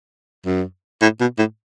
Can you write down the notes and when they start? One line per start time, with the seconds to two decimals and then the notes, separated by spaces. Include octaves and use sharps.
0.46 F#2
1.02 A2
1.20 B2
1.38 A2